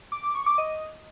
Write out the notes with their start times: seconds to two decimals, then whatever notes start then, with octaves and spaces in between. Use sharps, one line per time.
0.12 D6
0.23 D6
0.35 C#6
0.46 D6
0.58 D#5